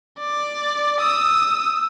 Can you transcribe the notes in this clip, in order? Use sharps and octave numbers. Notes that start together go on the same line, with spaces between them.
D5
D#6 E6